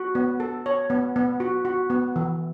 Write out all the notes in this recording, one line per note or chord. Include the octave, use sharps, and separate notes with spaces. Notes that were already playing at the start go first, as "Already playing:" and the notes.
Already playing: F#4
B3
A4
C#5
B3
B3
F#4
F#4
B3
E3